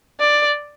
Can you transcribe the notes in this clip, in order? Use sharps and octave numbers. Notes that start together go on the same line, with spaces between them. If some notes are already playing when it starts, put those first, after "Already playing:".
D5